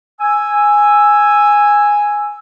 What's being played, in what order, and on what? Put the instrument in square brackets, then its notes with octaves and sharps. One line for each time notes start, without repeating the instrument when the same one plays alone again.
[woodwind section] G#5 E6